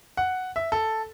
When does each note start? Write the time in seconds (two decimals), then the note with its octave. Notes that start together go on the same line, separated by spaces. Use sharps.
0.17 F#5
0.56 E5
0.72 A4